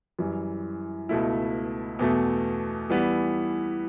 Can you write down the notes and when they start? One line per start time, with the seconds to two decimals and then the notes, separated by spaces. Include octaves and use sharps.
0.19 F#2 E3 G3
1.09 C#2 B2 A3 E4
1.99 E2 B2 A3
2.90 E3 G3 B3